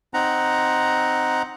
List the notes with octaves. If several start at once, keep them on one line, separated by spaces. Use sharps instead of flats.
C4 D#4 F#5 A#5